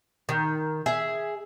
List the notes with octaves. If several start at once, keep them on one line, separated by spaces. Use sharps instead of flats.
D#3
G#4 E5